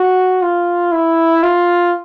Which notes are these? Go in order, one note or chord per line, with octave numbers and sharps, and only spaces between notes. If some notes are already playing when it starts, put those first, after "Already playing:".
Already playing: F#4
F4
E4
F4